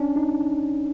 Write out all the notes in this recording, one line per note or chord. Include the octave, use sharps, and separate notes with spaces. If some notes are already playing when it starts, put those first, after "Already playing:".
Already playing: C#4 D4
D#4